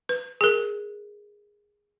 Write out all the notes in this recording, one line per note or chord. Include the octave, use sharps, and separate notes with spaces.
B4
G#4 A#4